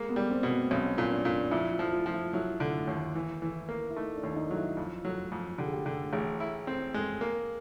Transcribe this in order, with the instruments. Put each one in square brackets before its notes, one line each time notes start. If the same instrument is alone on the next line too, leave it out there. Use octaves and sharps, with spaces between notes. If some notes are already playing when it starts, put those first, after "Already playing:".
Already playing: [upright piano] G#3 [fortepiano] A#3
[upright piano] B3
[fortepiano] G3
[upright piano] C4
[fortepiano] B2
[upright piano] B3
[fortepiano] B1 [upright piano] C#4
[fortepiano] A#2
[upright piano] D4
[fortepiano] A#2
[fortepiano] F2 [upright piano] E4
[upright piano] F4
[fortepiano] F3
[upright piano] F4
[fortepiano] F3
[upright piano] E4
[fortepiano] F#3 [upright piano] E4
[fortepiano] D3
D#2
E3
E3
A#3
[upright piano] E4
[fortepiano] A3 [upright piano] D#4
[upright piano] D4
[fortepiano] D#2
[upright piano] D#4
[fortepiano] F#3 [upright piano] F4
[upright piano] E4
[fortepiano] F2 [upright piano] F4
[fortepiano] F#3
F2
[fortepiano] D3 [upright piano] G4
[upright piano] G#4
G4
[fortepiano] D3 [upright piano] G4
[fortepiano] A1 [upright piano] G#4
[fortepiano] E4
C4
G#3
A#3